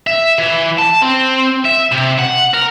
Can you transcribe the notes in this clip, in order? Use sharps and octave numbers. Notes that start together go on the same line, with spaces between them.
E5
E3
A5
C4
E5
C3
F#5
A#4